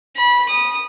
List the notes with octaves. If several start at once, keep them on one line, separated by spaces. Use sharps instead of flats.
B5
D#6